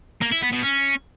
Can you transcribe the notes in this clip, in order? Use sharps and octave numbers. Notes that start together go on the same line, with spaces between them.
A#3
E4
B3
B2
C#4